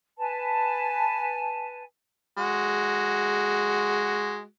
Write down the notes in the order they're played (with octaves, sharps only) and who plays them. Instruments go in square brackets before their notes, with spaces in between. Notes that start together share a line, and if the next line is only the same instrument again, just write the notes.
[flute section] B4 G#5 A5
[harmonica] G#3 F#4